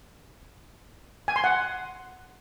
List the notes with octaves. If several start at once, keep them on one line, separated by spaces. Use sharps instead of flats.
G#5
C6
F#5